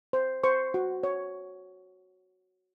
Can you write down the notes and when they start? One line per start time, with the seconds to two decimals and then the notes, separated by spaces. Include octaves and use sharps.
0.13 C5
0.44 C5 C#6
0.74 F#4
1.03 C#5